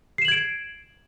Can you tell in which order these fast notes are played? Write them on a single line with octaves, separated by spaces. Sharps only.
C7 E7 F#7 G#6 D7